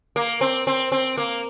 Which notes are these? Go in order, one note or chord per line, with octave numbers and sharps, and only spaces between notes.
A#3
C4
C4
C4
A#3